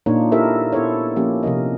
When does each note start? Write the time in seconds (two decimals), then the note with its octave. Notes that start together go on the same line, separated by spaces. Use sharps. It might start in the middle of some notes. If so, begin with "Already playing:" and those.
0.06 A#2 A#3 D4 D#4 F4 C#5
0.32 E4 G4 A4 A#4 C5 E5
0.73 B3 E4 A4 C5 C#5
1.16 F3 A#3 C#4 G4
1.43 C3 F3 A#4 D#5